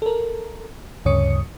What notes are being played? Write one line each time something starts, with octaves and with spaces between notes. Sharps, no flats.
A4 A#4
D2 G2 C#3 C#5 D#6 C#7